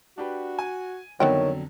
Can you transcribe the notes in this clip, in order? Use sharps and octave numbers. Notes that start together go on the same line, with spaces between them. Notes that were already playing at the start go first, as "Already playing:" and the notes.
D4 F#4 G4 B4
G#5
F2 D3 D#3 F#3 B3 C#5 E5 G5